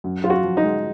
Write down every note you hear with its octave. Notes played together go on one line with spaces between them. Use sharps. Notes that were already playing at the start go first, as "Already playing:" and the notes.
F#2
F#2 F4
F#4
F3
D#4
G#3